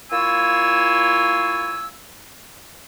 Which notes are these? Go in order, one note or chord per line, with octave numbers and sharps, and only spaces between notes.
A#3 E4 F4 C#5 G#5 E6